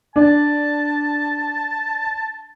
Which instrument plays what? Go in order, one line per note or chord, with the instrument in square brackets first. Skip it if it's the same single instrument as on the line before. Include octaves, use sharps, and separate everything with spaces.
[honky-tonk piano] D4 [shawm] A5